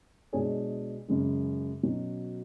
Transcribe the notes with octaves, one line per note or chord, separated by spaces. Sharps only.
B2 G#3 D4 G#4 C#5
F#2 C#3 G#3
B2 F#3 C#4 F#4